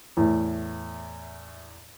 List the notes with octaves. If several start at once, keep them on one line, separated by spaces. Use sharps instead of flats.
E2 A2